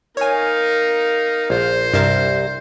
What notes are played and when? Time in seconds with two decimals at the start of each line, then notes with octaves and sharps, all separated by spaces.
0.17 D#4 A#4 C#5 F5 G#5
1.50 A#1 C5
1.94 C2 G2 A#4 A5